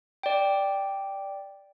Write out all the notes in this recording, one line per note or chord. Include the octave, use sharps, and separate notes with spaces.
D5 G5